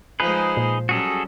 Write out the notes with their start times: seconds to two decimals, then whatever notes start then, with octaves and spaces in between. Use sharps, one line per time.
0.20 F3 G#3 D#4 G#4 B4 C5
0.57 A#2
0.89 F#3 G3 C#4 F#4 G#4 A4